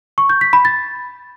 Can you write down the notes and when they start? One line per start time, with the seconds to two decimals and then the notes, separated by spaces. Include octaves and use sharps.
0.18 C#6
0.29 G6
0.41 B6
0.53 B5
0.65 A6